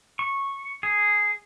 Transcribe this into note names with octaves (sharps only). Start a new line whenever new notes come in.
C#6
G#4